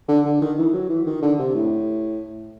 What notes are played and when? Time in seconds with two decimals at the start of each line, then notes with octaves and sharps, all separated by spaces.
0.08 D3
0.25 D3
0.41 D#3
0.58 E3
0.73 F#3
0.89 E3
1.06 D#3
1.22 D3
1.39 C3
1.55 A2